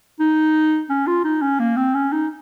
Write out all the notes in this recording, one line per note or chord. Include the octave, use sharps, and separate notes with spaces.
D#4
C#4
F4
D#4
C#4
A#3
C4
C#4
D#4